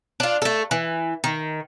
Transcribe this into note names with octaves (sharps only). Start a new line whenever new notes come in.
D4 F4
A3 A4
E3
D#3